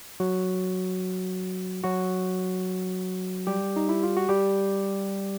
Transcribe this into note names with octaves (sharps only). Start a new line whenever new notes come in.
F#3 F#4
F#3 F#4
G3 G4
D#4
E4
F4
F#4
G3 G4